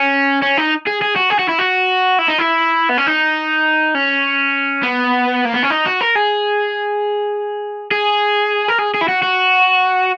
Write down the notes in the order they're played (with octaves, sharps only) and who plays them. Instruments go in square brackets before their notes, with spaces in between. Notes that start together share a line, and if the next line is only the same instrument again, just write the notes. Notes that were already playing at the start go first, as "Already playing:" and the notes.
Already playing: [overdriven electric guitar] C#4
C#4
D#4
G#4
G#4
F#4
G#4
F#4
E4
F#4
E4
D#4
E4
B3
C#4
D#4
C#4
B3
A#3
B3
C#4
D#4
F#4
A#4
G#4
G#4
A#4
G#4
G#4
E4
F#4
F#4